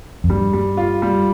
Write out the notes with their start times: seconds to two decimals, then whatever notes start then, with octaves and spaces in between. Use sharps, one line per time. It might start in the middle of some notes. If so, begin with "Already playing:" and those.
0.24 F2
0.29 G2 G3
0.53 G3
0.77 F4
1.02 G3